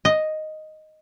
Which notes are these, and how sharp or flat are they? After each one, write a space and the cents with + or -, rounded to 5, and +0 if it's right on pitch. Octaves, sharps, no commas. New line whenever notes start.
D#5 +0